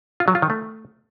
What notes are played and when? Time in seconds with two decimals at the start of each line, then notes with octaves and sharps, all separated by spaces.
0.20 F4
0.28 F#3
0.35 F4
0.42 D#3
0.50 A3